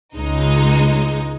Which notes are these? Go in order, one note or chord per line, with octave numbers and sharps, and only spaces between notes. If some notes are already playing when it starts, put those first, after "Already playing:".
C#2 G#3 D#4